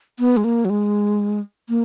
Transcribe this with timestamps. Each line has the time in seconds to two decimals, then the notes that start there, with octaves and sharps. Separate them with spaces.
0.19 B3
0.37 G#3
0.44 A#3
0.65 F#3
0.70 G#3
1.69 A#3